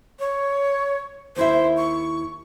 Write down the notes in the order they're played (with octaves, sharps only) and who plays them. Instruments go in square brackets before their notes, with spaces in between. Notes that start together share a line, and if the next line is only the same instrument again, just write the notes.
[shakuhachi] C#5
[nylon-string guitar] D#2 E4 E5 [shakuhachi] C5
[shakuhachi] C#6